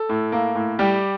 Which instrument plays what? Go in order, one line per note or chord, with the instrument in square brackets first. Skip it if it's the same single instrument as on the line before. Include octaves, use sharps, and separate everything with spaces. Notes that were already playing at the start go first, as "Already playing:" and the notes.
Already playing: [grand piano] A4
A2
A#3
A2
G3 G4